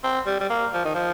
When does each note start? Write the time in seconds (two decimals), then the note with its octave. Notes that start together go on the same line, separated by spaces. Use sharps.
0.03 C4
0.26 G3
0.40 G3
0.50 A#3
0.73 F3
0.85 D#3
0.95 F3